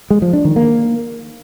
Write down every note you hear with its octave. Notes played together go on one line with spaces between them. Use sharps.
G#3
F3
D4
D#3
A#3